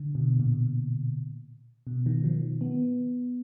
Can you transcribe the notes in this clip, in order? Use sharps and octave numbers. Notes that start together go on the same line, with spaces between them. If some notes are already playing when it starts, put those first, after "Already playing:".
Already playing: D3
B2
A#2
B2
D#3
F3
B3